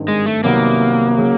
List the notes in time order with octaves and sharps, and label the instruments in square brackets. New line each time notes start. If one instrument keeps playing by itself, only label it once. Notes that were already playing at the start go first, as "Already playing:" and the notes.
Already playing: [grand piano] G#1 G2 D#3
[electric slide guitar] G#3
A3
[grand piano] C2 C3 D#3 F#3 B3 [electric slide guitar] A#3
[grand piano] C#3 F#3